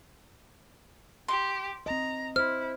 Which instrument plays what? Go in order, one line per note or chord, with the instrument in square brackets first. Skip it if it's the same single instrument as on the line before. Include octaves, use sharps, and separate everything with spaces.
[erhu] G4 [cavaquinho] C6
[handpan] C4 D#5 [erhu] A#5
[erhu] E4 [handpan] C5 [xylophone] F6